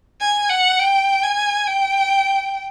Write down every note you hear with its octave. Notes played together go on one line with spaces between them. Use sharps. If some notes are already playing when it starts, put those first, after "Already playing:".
G#5
F#5
G5
G#5
G5